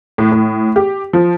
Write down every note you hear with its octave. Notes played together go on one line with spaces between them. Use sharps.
A2
A2
G4
F3